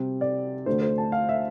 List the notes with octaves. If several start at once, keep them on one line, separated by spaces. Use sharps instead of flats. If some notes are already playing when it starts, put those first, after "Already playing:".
Already playing: C3 G3 C4
D5
D2 D3 A3 D4 C5
C5
A5
F5
E5